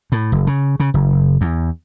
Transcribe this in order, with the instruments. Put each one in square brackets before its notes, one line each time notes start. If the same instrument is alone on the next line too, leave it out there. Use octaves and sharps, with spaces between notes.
[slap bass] A2
F#1
C#3
C#3
F#1
E2